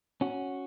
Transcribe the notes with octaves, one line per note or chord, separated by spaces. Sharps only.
C#4 F#4